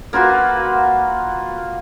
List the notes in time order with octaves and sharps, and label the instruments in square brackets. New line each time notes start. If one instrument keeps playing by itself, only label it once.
[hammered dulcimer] A#3 F4 F#4 B4